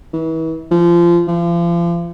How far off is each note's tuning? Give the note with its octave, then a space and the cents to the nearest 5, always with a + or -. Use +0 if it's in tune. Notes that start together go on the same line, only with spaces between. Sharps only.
E3 -35
F3 -25
F3 -35